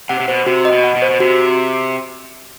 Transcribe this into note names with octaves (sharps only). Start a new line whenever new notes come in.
C3 F#5
C3
B2 C5
C3 F#4
D#5
B2
F#5
B2
C5
B2
C3 F#4